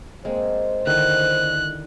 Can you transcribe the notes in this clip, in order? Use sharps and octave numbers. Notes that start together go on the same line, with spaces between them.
G#3 A#3 C4 C5
D3 D#3 E4 F#6